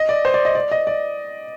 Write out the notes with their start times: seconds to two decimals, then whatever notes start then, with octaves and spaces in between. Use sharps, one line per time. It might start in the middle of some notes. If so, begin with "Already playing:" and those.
Already playing: D#5
0.09 D5
0.25 C5
0.34 D5
0.45 D#5
0.55 D5
0.71 D#5
0.87 D5